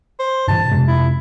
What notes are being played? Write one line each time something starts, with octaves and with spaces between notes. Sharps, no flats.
C5
G2 B2 E3 A5
F2 C3 G#3
E4